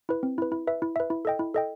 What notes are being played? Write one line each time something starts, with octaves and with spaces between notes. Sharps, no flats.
E4 B4
C4
E4 B4
E4
B4 E5
E4
B4 E5
E4
A4 D#5 G5
E4
A4 D#5 G5